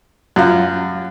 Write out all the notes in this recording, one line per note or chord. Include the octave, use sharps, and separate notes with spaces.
F#2 F4